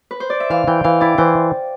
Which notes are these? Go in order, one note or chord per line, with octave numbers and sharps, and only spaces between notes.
B4
C5
D5
E5
E3 F5
E3 G5
E3 F5
E4 D5
E3 C5